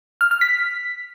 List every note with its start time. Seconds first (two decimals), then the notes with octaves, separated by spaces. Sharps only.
0.21 F6
0.31 F6
0.41 B6